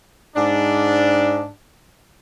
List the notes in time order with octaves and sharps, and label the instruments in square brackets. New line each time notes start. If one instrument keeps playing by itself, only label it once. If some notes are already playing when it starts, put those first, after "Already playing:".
[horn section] G#2 D4